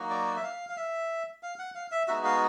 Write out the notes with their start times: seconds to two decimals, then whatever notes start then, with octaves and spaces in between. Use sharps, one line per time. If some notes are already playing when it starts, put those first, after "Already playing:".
Already playing: F#3 A#3 D#4 F#4
0.10 D5
0.36 E5
0.43 F5
0.69 F5
0.77 E5
1.43 F5
1.59 F#5
1.75 F5
1.92 E5
2.08 G#3 B3 D#4 F#4 E5
2.24 F5